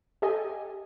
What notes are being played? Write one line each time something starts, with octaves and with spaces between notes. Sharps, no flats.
G4 A4 D#5 G#5